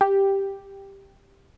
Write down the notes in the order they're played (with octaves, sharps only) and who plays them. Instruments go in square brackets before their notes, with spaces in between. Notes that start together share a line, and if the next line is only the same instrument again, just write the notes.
[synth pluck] G4